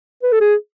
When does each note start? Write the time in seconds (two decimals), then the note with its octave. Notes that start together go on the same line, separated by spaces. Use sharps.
0.23 B4
0.32 A4
0.41 G#4